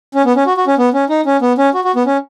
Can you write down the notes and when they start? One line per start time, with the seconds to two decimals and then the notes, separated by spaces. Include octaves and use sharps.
0.15 C#4
0.25 B3
0.36 C#4
0.46 F#4
0.57 F#4
0.67 C#4
0.78 B3
0.94 C#4
1.10 D#4
1.26 C#4
1.42 B3
1.58 C#4
1.74 F#4
1.84 F#4
1.96 B3
2.06 C#4